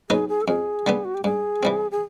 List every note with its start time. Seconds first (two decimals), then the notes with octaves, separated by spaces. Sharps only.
0.10 F#3 B3 D#4 G#4
0.29 G#4
0.42 A4
0.47 F2 G#4
0.86 D3 G3 B3
1.05 F#4
1.15 G4
1.24 G2 G#4
1.63 E3 G3 C4
1.91 G#4